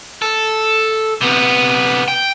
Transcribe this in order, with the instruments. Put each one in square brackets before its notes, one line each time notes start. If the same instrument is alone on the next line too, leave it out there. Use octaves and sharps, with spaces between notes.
[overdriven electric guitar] A4
C3 B3
G5